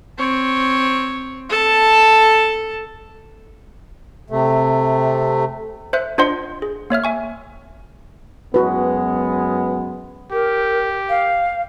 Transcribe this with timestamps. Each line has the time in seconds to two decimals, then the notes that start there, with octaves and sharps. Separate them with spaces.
0.18 C4 C#5
1.49 A4 A5
4.30 C3 A3
5.93 C5 E5 F#6
6.18 D4 F4 C5 D#5 F#5 C6
6.62 G#4
6.90 A#3 C#5 E5 F6
7.04 E5 G#5 C#6
8.54 F#2 G#3 B3 F#4 B4
10.32 G4 A#4
11.09 F5